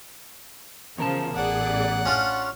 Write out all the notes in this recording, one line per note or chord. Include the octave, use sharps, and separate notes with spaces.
E2 C#3 F3 A#4 A5
A1 G#4 D5 F#5
C#4 D4 F4